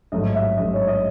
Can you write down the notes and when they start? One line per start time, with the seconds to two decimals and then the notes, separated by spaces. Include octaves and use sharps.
0.12 A1 G#2 F#3 A3 D#5
0.35 E5
0.57 A1 G#2 F#3 A3 D#5
0.73 C#5
0.88 D#5